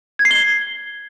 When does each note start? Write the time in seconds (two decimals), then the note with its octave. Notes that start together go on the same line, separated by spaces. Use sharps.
0.19 G#6
0.25 C7
0.31 G7